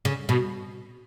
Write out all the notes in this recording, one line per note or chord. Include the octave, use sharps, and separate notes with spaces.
C#3
B2